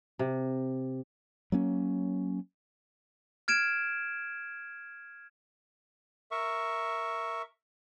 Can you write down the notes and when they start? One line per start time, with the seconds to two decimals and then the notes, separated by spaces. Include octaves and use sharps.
0.19 C3
1.52 F#3 A#3 C#4
3.48 F6 G#6 D7 E7
6.31 A#4 E5 C#6